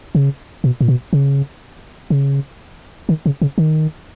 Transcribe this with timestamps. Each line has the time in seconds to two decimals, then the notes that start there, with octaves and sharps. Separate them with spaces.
0.15 C#3
0.64 B2
0.81 A#2
0.88 B2
1.13 C#3
2.10 C#3
3.09 D#3
3.26 C#3
3.42 C#3
3.58 D#3